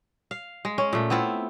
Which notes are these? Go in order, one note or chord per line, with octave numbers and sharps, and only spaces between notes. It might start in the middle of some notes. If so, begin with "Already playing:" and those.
F5
G#3
C#4
A#2 A3
B3 C4 E4 F4